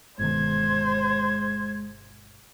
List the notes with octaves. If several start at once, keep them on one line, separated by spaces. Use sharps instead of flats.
G1 B2 D#3 G#3 C5 G#6